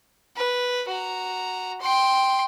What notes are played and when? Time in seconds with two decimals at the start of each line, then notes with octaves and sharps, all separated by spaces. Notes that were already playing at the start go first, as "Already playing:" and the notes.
0.36 B4
0.89 F#4 A#5
1.81 G5 C6